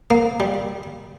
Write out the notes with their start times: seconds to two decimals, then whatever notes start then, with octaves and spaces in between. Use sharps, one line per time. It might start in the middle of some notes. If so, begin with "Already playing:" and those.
0.11 A#3
0.40 G3